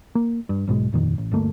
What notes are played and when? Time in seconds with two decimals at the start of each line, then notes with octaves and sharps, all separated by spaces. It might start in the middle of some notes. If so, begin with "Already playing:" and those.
0.15 A#3
0.49 G2
0.67 B1 G#2 B2 G#3
0.93 G1 F2 A#2 D#3
1.18 A1
1.31 G1 D2 A3 A#3